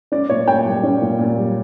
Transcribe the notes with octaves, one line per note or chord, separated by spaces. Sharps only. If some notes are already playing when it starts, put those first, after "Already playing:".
C#4 D5
A#2 C#5
A#2 G5
G3
C#4
A#2
A#2
G3